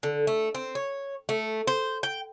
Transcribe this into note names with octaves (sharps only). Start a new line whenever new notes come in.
D3
A3
C4
C#5
A3
C5
G5